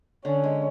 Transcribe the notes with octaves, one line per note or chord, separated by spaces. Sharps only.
D3 C#4
G#3